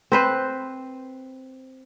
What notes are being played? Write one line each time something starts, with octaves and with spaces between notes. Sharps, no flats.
C4 B4 C5